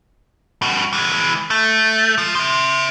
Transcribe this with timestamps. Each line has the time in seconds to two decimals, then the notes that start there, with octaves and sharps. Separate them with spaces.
0.62 G2 F#4
0.93 E3 G#3
1.50 A3
2.18 F3
2.35 C5 E5